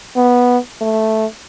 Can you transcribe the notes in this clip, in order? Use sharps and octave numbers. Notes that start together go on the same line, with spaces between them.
B3
A3